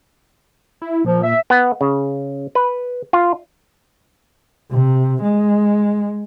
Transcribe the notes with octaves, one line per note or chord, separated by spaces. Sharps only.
E4
A#2 F3
E5
B3
C#3
B4
F4
C3
G#3